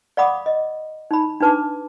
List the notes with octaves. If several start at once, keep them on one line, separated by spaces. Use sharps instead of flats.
D5 F5 F#5 B5 D6 D#6
D#5
D#4 B5
D4 D#4 B4 A5 D6